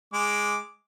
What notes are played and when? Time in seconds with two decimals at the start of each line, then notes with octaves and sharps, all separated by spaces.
0.14 G#3 D6